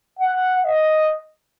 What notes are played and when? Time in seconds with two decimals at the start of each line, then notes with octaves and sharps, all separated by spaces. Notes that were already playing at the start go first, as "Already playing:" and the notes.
0.19 F#5
0.65 D#5